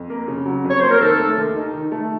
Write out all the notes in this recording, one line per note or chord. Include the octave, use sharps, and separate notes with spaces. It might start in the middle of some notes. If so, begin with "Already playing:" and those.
Already playing: F2
A#3
C#3
F#3
F2
C#5
A#3 C5
A#4
D#3 A4
A3
D#2
D#4
D#3
A3